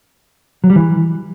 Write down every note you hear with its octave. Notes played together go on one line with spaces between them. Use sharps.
F#3
G3
E3